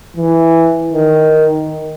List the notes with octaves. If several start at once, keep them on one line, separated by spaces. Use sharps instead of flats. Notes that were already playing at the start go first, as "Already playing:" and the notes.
E3
D#3